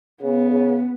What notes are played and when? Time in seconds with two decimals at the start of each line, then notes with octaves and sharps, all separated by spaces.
0.22 C#3 B3
0.51 C#3